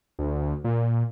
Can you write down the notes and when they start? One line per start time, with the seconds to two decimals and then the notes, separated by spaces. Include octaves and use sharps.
0.19 D2
0.64 A#2